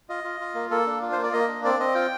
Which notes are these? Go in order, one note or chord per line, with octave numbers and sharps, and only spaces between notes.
F4 D#5
F4
F4
A#3
A#3 A4
D4
F4
C5
A#3
D5
A#3 D#5
D4
C4 D5
C4 D#5
F4 G5